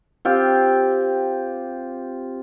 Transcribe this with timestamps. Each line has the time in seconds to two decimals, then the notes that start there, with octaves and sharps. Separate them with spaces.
0.25 C4 F4 G4